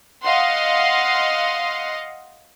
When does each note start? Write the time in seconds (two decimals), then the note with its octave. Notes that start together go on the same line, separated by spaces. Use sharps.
0.23 D#5 F5 F#5 C6